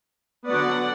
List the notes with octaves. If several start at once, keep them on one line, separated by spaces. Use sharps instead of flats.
D3 F#3 B3 D5 F#5